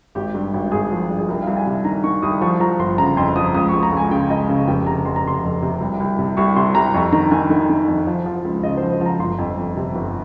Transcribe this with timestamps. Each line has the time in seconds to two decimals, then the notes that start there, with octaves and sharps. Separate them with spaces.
0.15 G#1 G4
0.34 G2
0.54 G#1
0.72 G#1 G#4
0.91 F3
1.10 G2
1.18 G#4
1.29 C2 A#4
1.43 F5
1.47 C2
1.57 G#5
1.66 C3
1.85 D#3 A#5
2.04 D#3 C#6
2.22 C2 D#6
2.41 F3 C#6
2.60 F3 A#5
2.79 G1 C6
2.98 C#3 A#5
3.17 F2 C6
3.35 F3 D#6
3.55 C#2 D#6
3.69 C#6
3.73 C#2
3.83 A#5
3.92 C#2 G#5
4.11 C#3 G5
4.30 C#2 D#5
4.49 C#3
4.68 F1 G5
4.86 C3 A#5
5.05 F2 C6
5.16 A#5
5.24 C3 C6
5.43 F2
5.62 C3
5.81 C2
6.00 C2
6.19 C3
6.37 C2 C#6
6.56 C3 C6
6.75 C2 A#5
6.94 F2 C#6
7.12 D#3 A#5
7.31 D#3 G#5
7.50 D#3
7.69 D#3
7.88 F2
8.07 F3
8.26 F3
8.45 C#2
8.63 C#3 D#5
8.77 C5
8.82 F3
9.01 F3 A#5
9.19 G1 C6
9.39 F2
9.58 F2
9.76 C3
9.95 G1